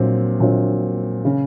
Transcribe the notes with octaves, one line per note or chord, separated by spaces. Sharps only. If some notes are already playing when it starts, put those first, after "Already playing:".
Already playing: A#1 A#2 F#3 C4
A#1 A#2 F#3 C4
C#3